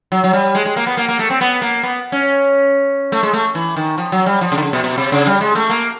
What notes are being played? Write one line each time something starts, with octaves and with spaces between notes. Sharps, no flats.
F#3
F#3
G3
G#3
G#3
A#3
B3
A#3
A#3
A3
C4
B3
A#3
B3
C#4
A3
G#3
A3
E3
D#3
F3
F#3
G3
F3
C#3
D3
C#3
B2
B2
C3
C#3
G3
G#3
A3
A#3